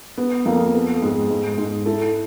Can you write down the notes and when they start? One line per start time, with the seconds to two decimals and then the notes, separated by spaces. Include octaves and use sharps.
0.18 B3 B4
0.45 F2 A#3 A#4
0.74 B3 A4
1.02 G#2 G#4
1.30 G#2
1.58 G#2
1.86 E4 A4